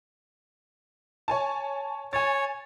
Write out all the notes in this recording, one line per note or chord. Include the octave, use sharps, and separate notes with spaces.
C#5 G#5 A5
C#5 G#5 A6